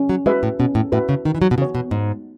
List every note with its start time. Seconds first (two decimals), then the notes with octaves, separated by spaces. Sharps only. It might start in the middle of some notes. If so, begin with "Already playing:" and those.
Already playing: C#4
0.09 F#3
0.26 G#3 F#4 B4 E5
0.43 A2
0.59 B2 C#4
0.75 A2
0.92 A2 F#4 B4 E5
1.09 C#3
1.25 D#3 D#4
1.35 E3
1.42 F#3
1.51 B2
1.58 C#3 F#4 C#5
1.75 B2
1.91 G#2 D#4